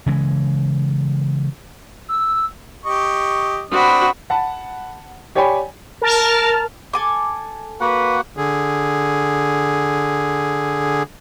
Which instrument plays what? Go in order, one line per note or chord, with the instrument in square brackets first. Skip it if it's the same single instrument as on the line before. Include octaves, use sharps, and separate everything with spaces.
[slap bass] C#3 E3 G#3
[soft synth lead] E6
[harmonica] G4 D#5 C#6
[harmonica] C4 D4 D#6 [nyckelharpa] F#4 B5
[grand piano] F#5 A5 B5
G4 C#5 D5 G5 G#5 B5
[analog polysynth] A#4 A5 F6
[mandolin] A4 G#5 D6
[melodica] A#3 F#4 F#5 [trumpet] B4
[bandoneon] D3 G#4